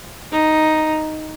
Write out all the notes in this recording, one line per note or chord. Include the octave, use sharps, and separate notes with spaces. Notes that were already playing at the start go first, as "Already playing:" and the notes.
D#4